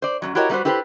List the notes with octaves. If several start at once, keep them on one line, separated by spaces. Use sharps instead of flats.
C5 D5
F#2 B2 F#3
E4 F#4 G4 A#4 C#5 D#5
G3 A3 A#3 F#4 B4 C5
E4 G4 A4 B4 C5